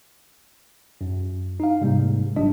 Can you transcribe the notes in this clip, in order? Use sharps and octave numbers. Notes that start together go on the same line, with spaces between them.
F#2
D#4 F5
G#2 C3 G3 A#3
G1 G2 F#3 G3 D4 D#5